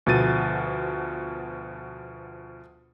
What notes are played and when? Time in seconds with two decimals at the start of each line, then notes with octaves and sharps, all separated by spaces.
0.06 D2 B2 F3 A6 D#7